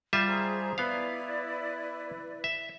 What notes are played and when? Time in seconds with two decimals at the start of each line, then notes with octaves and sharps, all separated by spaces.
0.13 G3 F4 E5
0.27 G#4 C5 A#5
0.78 B3 E4 B4 D5 F5
2.44 E5